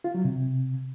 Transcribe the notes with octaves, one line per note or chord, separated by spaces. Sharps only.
F4
F#3
C3